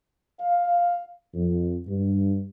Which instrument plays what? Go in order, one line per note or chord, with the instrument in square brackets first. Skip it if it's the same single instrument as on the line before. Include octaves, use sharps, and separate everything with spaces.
[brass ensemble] F5
F2
G2